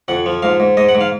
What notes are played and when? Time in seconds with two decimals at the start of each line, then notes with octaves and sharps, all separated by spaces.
0.08 F2 F#5
0.26 F3
0.43 G#2 F5
0.60 G#2
0.77 G#2 D#5
0.89 F#5
0.95 G#2
1.01 F5